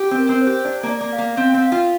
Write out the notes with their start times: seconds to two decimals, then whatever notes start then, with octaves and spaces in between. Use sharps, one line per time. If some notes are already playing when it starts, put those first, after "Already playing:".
Already playing: G4
0.11 C4
0.18 A#4
0.29 C4
0.41 C5
0.47 G4
0.65 D4 D5
0.83 A#3
0.89 D5
1.01 A#3
1.13 F5
1.18 A#3
1.37 C4 F5
1.49 C4 G5
1.62 F5
1.72 F4